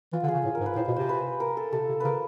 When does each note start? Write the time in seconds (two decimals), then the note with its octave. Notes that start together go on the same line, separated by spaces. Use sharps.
0.13 E3 F4
0.23 D3
0.28 G#4
0.34 C#3
0.45 A2
0.55 A#4
0.61 G#2
0.66 B4
0.76 A2 C5
0.87 B2
0.96 C3 C5
1.09 B4
1.40 A#4
1.57 A4
1.73 C3 A4
1.89 C3
2.00 C#3 A#4 B4